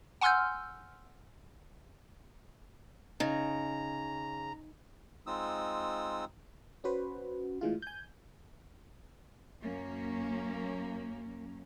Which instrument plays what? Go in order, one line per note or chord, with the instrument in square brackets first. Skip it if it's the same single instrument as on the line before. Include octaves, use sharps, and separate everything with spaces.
[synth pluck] F#5 G#5 C6 E6 F6 G6
[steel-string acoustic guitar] C#3 [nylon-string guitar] D#4 [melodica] A#5
[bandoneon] G#3 C4 D#4 F4 D#6 E6
[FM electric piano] C#4 F#4 B4 C5
A2 E3 G#3 F4
G#5 G6
[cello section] F#2 A#3 C#4